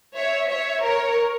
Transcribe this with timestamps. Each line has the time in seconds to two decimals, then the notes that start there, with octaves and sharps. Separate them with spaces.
0.16 C#5 E5
0.50 C#5 E5
0.84 A#4 C#5